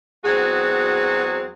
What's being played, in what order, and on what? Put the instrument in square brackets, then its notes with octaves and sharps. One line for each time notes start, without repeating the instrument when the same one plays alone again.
[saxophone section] E2 F#3 G#3 C4 F#4 G#4